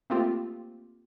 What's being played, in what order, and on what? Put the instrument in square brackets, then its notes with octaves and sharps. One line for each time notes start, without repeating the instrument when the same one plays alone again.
[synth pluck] A3 A#3 C4 F4 G4